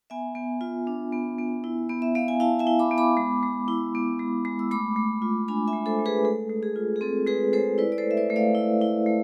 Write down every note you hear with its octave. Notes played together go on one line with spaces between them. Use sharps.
B3 E5 G#5
B3
F4
D4
B3
B3
E4
B3
E5
B3 F5
G#5
E4 F5 A5
E5 G#5
E4
B5 D6
B3
B5 D6
G#3
G#3
E4
B3
G#3
G#3
E6
A3 B5 D6
A3
F4
D4 G#5 B5
E5 G#5
A3
A4 C5
A3
G#4 B4
G#3 A4
G#3
G#4
F4
G#4
C4 A4
G#3 G#4 B4
G#3 A4 C5
E4 B4 D5
D5
A4 C5
A3
E5
B4 D5
A3
D5 F5
E4
E4
A3